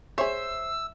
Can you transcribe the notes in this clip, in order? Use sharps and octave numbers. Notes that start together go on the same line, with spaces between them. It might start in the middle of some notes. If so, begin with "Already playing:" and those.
G#4 C5 C#5 E5 E6